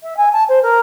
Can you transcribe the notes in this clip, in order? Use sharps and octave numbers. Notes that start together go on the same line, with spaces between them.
E5
G#5
A5
C5
A#4